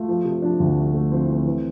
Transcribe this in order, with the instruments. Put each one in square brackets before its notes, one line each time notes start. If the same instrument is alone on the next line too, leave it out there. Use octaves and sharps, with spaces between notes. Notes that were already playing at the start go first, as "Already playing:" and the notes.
Already playing: [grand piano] A3 F4
F3
C3
F3 D4
D2
A3
A3
F3 C4
E4
A3 C4
E3